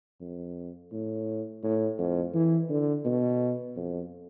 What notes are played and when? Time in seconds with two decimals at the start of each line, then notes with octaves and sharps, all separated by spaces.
0.21 F2
0.92 A2
1.64 A2
1.98 F2
2.34 E3
2.69 D3
3.05 B2
3.76 F2